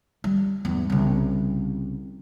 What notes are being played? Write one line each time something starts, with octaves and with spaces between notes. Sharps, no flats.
G3
E2 G#2
C2 C#3